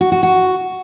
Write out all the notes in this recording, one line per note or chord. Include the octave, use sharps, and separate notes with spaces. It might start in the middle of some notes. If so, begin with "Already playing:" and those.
F#4
F#4
F#4